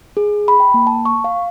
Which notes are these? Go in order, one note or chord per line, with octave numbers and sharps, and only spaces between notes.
G#4
B5
G5
A#3
A5
C#6
F5